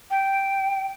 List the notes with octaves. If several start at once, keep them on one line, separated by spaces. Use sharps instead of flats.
G5